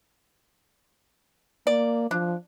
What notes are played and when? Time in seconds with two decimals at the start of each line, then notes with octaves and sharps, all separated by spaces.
1.67 A#3 D5
2.11 F3 D4